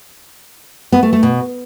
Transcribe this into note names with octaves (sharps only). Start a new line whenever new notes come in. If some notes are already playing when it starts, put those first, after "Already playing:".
B3
A3
A3
B2